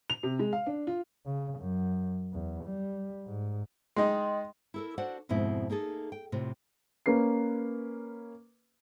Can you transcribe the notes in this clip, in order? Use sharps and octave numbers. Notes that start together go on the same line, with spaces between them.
F7
C3
G#3
F5
D4
F4
C#3
F#2
E2
G3
G#2
G#3 D#4 D#5 G5 C6
E4 A4 A#4
D4 F#4 C5 D5 F#5
F2 G#2 B2 C4 E4
A#3 D#4 G#4 A4
G5
A2 C3 F4
A#3 C#4 B4 C7